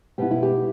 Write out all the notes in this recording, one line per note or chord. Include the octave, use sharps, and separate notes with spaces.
B2 B3 E4 G4
E4
G4